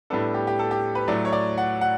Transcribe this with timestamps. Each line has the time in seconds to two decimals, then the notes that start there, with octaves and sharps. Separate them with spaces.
0.10 A2 G3 B3 D4 A4
0.34 G4
0.47 G4
0.59 A4
0.71 G4
0.95 B4
1.08 A2 F#3 A3 D5
1.25 C#5
1.33 D5
1.58 F#5
1.81 F#5